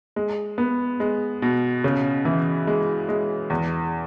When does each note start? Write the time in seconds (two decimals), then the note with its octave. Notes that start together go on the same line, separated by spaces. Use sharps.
0.16 G#3
0.58 B3
1.00 G#3
1.42 B2
1.84 C#3
2.25 E3
2.67 G#3
3.09 G#3
3.50 E2